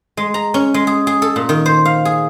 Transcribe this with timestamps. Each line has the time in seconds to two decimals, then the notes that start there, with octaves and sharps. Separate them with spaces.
0.17 G#3
0.34 A#5
0.54 C#4
0.74 G#3
0.87 G#4
1.07 G#4
1.22 A4
1.36 A#2
1.49 D#3
1.66 C5
1.85 F5
2.05 G#4